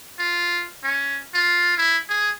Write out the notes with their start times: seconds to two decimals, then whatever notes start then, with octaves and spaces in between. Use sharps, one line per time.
0.19 F4
0.83 C#4
1.34 F4
1.78 E4
2.09 G#4